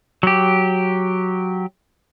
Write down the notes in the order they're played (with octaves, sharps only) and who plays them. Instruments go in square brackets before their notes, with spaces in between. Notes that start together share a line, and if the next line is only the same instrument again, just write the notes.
[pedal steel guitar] F#3 G4